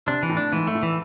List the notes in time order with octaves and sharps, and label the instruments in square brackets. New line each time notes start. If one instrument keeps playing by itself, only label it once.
[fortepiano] C3 [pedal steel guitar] D4
[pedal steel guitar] E3
[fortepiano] A2
[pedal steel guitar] D4
[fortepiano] G#2 [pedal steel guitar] E3
[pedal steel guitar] A3
[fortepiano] A2
[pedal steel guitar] E3